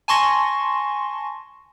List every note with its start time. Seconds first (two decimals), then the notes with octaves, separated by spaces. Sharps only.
0.08 G#5 A5 C6 C#6 A#6